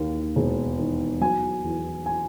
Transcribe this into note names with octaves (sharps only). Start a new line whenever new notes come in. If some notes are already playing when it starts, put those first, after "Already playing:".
Already playing: D#2 A#3
E1
D#3
F#3 G#5
E2
G#5